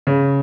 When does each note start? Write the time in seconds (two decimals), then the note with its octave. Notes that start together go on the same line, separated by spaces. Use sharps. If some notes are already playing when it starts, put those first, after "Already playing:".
0.07 C#3